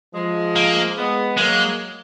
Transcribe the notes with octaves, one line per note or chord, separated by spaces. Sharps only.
F3 G#3
A#3
G#3 B3
F#3 G#3 A#3